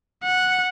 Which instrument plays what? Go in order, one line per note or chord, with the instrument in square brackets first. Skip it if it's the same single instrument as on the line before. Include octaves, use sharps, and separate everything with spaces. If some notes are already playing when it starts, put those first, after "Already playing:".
[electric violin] F#5